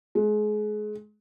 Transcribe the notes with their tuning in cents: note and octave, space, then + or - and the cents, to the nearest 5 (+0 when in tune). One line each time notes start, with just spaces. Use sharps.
G#3 +30